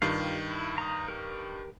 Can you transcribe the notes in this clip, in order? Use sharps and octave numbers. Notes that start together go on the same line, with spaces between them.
G2 D#3 F4 G4 F5
E4
A#5 D#6
G4 A#4